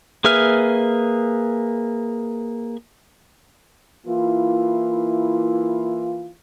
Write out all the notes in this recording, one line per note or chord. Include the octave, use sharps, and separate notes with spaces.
A#3 G#4 B4 E5 F6
E3 A#3 E4 F4